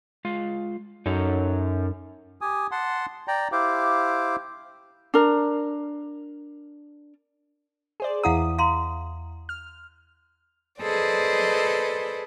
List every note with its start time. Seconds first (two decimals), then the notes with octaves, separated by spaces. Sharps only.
0.25 G#3 F4 F5
1.06 F#2 D#4 A4 C#5
2.41 G4 G#5 D#6
2.71 F#5 A5 C6
3.28 D5 G5 A#5
3.52 E4 G4 C5 F5 D6
5.14 D4 A#4
8.00 G#4 C5 D5
8.23 E2 E4 F5 F#5 A#5 D#6
8.59 F5 A#5 C6
9.49 F6
10.82 G#4 A4 B4 C5 D5 D#5